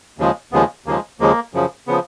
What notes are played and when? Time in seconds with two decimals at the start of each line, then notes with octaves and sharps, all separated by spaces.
0.18 D#2 C#3 F3 G#3
0.52 D#2 C#3 F3 G#3 B3
0.86 D#2 C#3 F3 G#3 A#3
1.20 D#2 C#3 F3 G#3 A#3
1.53 F#2 C#3 F3
1.87 C#3 F3 B3